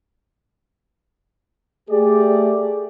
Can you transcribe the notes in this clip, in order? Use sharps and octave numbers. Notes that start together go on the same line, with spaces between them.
A3 G4 G#4 D5